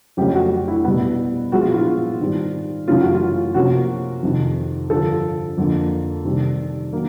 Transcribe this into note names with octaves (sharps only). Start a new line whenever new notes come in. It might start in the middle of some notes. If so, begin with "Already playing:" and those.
F2 C#3 F#3 A3 C#4 G4
F#4
E4
B2 G3 B3
A#2 F3 G#3 B3 F#4
F4
E4
F4
G#2 D#3 G3 C4
F#2 C#3 E3 A3 C#4 F4
F#4
F4
C3 F3 A#3 C#4 F#4
F2 C3 D#3
G2 D3 F3 A4
F2 D3 F3 A#3
C3 D#3 G3
D#3 F#3 A#3